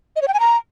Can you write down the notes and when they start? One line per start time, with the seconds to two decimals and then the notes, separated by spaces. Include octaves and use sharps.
0.16 D#5
0.22 C#5
0.28 G5
0.34 G#5
0.40 A#5